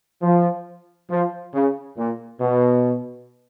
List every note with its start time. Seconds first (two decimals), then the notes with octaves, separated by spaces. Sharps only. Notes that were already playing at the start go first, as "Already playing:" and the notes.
0.22 F3
1.10 F3
1.54 C#3
1.98 A#2
2.41 B2